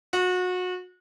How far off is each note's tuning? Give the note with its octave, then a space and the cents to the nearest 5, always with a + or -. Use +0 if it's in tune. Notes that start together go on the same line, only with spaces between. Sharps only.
F#4 -30